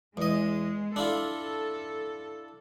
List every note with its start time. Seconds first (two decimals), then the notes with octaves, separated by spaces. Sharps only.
0.17 E2 G#3 D#5
0.96 D4 E4 F4 A4